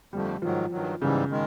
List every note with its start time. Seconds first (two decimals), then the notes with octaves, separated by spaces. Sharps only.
0.13 F2 D3 F3 G3 A3
0.42 G#2 D#3 F3 F#3
0.72 G2 D#3 F#3
1.01 G#2 C#3 E3 G3
1.31 D#3 G#3